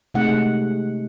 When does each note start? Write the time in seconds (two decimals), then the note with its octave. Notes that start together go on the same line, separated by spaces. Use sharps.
0.14 C3 G#3 A3 D#4 F#5